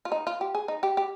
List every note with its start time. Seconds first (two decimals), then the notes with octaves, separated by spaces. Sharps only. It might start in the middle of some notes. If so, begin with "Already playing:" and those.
0.05 F4
0.12 D#4
0.27 F4
0.41 G4
0.55 G#4
0.68 D#4
0.83 G4
0.97 G4